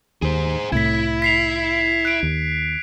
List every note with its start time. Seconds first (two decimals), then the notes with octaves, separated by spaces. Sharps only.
0.22 D#2 G#4 C5
0.72 C2 A2 E4 G#6 B6
1.22 B6 C7 F7
2.05 F#6 D7
2.23 D#2